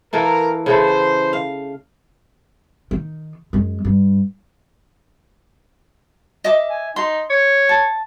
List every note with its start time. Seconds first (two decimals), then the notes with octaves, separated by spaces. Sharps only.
0.13 E3 A3 A#3 A#4
0.66 C#3 E3 A3 C5
1.33 F5
2.91 D#3
3.53 F#2 G#3
3.85 G2
6.44 D#5 E5 D6
6.70 G#5
6.96 D#4 C6
7.30 C#5
7.69 A5